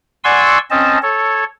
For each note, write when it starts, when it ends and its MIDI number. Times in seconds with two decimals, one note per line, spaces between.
0.24 0.58 74
0.24 0.58 78
0.24 0.58 80
0.24 0.58 84
0.24 0.58 85
0.24 0.58 88
0.70 0.98 60
0.70 0.98 61
0.70 0.98 75
0.70 0.98 81
1.02 1.44 69
1.02 1.44 73